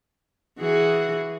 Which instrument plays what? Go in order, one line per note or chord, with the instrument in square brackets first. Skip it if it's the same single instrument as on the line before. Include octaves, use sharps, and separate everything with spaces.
[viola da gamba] E3 F#4 G#4